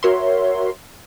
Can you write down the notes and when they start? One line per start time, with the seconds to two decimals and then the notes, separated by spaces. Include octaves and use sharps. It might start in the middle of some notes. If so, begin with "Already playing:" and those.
0.03 F#4 A#4 C#5 E5 C6